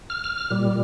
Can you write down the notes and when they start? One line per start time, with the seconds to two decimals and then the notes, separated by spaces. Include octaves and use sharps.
0.10 F6
0.24 F6
0.37 F6
0.50 A#2 G3